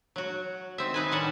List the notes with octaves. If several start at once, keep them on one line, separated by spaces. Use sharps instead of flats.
F#3 F#4
D#3 C4 E5
D#4 B4 G#5
A2 D#3 G3 F#5 G#5 A5